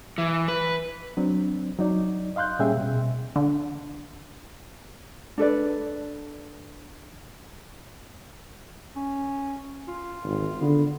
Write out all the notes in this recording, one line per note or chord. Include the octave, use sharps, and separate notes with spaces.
E3
B4
F#3 C4 D4
F#3 D#4 D5
D#5 F5 C6 F#6 G6
A#2 G3 C#4 G#4 E5 G5
B2
D3
D4 A4 B4 D5
C#4
F4
G#1
D3 B3